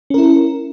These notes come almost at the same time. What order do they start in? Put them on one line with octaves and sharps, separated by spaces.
C#4 A#4 E4